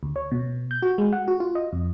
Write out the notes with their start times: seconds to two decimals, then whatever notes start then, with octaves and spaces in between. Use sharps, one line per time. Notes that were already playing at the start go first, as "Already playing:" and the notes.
0.03 D2
0.16 C#5
0.31 B2
0.71 G6
0.82 F#4
0.98 G#3
1.13 F#5
1.28 F#4
1.40 F4
1.55 D#5
1.73 F2